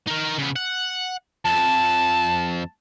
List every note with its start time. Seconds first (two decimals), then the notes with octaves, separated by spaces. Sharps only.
0.07 D#4 A#4
0.38 C#3 B3
0.56 F#5
1.45 F2 A5